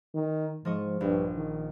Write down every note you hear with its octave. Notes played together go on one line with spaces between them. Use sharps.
D#3
G#2 F3 D#5 C#6
A#1 G2
D#3